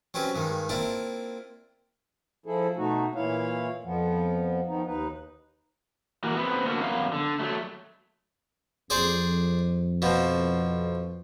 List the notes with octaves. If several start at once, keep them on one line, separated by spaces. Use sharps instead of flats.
F#3 C4 C#4 G4 B4
G2 D#3 G#3
A#3 C4 D4 E4 F4
F3 E4 G#4 A4
B2 A3 D#4 F#4
A#2 E3 E4 C#5 F5
F2 F3 B3
D#3 F3 B3 D#4
D#2 D#4 B4
E3 A#3 F#4
B3 C4
D3 A3 A#3 F#4
F#2 B3 F5
D3
F#3 A3
F2 G#4 C5 D5
B2 F3